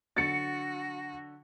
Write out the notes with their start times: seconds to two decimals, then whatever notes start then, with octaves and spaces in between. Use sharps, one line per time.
0.17 D3 F#3 F#4 A6 C#7